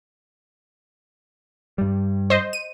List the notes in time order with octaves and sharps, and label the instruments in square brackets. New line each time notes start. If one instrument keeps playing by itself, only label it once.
[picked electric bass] G2 G3
[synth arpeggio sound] C5 D#5
D#7